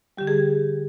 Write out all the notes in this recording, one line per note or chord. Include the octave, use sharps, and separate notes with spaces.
D3 G3 G4
G#4